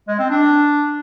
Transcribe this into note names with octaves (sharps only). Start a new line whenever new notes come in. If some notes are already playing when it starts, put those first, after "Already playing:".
G#3
C4
D4